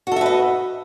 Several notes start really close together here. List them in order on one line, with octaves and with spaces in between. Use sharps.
F#4 A4 E5 B4 D#5